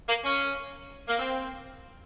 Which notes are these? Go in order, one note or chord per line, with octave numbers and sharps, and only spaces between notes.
A#3
C#4
A#3
C4